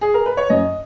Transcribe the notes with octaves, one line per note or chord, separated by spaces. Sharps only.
G#4
A#4
B4
C#5
F#2 D#5